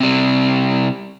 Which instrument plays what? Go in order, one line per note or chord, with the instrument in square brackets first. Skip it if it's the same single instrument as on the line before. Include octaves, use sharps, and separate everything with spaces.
[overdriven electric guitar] C3 G3